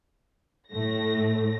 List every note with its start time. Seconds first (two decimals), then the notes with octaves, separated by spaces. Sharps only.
0.72 A2 A3 A#6